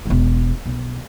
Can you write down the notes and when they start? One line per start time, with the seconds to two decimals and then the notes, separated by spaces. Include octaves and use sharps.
0.06 E1 G#3
0.66 B1